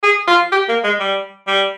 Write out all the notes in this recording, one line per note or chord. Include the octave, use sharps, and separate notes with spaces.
G#4
F4
G4
A#3
G#3
G3
G3